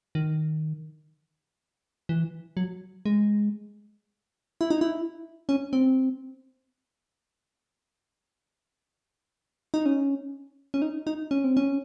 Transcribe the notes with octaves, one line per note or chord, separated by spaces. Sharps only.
D#3
E3
F#3
G#3
E4
D#4
E4
C#4
C4
D#4
C#4
C#4
D#4
D#4
C#4
C4
C#4